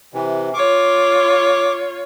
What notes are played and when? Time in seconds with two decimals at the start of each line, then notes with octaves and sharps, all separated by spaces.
0.14 C3 E3
0.54 F4 C#5 D6